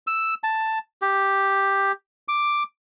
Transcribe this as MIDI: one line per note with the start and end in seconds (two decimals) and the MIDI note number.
0.07 0.34 88
0.44 0.79 81
1.02 1.92 67
2.28 2.63 86